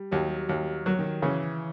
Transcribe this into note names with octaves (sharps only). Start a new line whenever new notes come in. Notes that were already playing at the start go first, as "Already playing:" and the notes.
Already playing: G3
D#2 F#3
D#2 F#3
F#3
D#3
C#3 E3